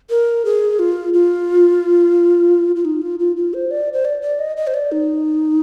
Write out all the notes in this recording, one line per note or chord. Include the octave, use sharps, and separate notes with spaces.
A#4
G#4
F4
F4
F4
D#4
F4
F4
F4
C5
D5
C5
D5
D5
D#5
D#5
C5
D5
D#4